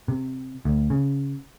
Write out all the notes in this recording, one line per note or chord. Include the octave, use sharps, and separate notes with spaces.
C3
D2
C#3